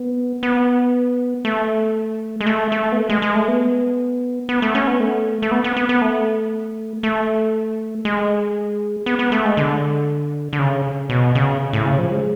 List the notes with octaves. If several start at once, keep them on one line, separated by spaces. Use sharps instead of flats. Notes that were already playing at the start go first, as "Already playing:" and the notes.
Already playing: B3
B3
A3
G#3
A3
A3
B3
A3
G#3
G#3
A3
B3
B3
A3
C#4
B3
A3
A3
B3
B3
B3
B3
A3
A3
G#3
B3
B3
A3
G#3
D3
D3
C#3
B2
C#3
A2
C#3
F3
G#3